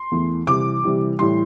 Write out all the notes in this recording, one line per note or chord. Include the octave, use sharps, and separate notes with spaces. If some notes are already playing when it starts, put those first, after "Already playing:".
Already playing: C6
E2 E3 A3
C3 E3 G3 D6
C3 E3 G3
A2 E3 G3 C6